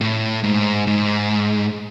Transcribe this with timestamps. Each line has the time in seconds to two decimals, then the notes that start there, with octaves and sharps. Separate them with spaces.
0.01 A2
0.44 G#2
0.87 G#2